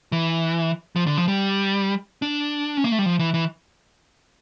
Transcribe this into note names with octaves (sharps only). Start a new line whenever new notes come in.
E3
F3
D3
F3
G3
D4
C#4
A#3
A3
G3
F3
E3
E3